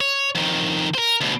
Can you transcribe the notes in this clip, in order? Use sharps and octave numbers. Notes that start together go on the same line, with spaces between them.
C#5
F2 D#3
A#4 C5
D2 B2